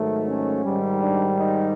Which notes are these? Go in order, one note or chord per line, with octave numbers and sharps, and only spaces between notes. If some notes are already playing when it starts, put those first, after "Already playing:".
Already playing: G#2 D#3 F#3 A3
C#4
G#2 D#3 G3
D4
D#4